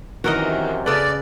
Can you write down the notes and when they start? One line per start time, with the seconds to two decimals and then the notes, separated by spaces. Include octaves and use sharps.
0.24 F#2 C3 D#3 E3 F#4 A#4 D#5
0.86 C#3 A4 B4 D5